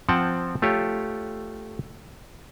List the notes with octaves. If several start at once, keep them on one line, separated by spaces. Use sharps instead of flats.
F3 C4 F#5 G5 A5
A3 F4 G4 C#5